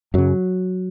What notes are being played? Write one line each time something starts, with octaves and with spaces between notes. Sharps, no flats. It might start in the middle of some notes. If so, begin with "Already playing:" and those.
F#2 C#3 F#3